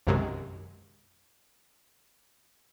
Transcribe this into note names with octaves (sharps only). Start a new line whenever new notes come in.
B1 F#2 C3 D#3 G#3